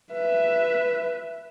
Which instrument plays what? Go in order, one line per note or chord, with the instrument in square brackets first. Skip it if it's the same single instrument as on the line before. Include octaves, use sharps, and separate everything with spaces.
[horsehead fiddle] B4 E5